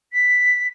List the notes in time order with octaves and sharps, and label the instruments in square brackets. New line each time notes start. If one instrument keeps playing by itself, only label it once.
[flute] B6